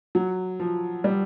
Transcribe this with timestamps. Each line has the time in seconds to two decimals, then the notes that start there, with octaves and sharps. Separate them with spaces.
0.15 F#3
0.60 F3
1.04 G3